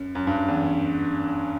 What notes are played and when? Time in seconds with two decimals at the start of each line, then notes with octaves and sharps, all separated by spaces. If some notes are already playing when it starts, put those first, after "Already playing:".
Already playing: F#2
0.15 F#2
0.27 G2
0.48 E2